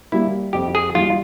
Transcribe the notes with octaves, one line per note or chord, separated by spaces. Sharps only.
G3 A#3 E4
F2 G4
G#4
E3 G3 F4